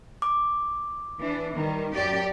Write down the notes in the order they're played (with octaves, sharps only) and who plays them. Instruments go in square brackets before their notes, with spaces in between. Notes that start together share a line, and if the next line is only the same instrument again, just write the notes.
[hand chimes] D6
[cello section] E3 D4
D#3 G3
F#2 G4 D5